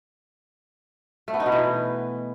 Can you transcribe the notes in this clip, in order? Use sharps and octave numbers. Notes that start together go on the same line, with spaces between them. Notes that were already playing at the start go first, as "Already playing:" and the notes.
A3
B3
D#4
B2
E3